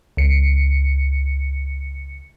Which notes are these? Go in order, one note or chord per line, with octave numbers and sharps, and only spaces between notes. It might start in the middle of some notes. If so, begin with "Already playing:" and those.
C#2 C#7